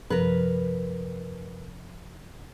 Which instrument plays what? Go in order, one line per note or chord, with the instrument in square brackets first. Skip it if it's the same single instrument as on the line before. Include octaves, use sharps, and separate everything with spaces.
[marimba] F#2 C3 F3 [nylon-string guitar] A#4 B4